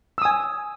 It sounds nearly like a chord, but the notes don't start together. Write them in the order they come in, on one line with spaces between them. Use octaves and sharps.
E6 D#6 G#5